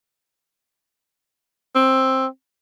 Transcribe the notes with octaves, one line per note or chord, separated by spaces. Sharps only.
C4